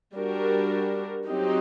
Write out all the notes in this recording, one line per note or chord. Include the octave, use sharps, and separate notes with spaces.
G3 D4 F#4 A#4
F#3 C4 D#4 G4